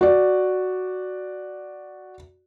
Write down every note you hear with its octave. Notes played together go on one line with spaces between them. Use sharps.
F#4 D5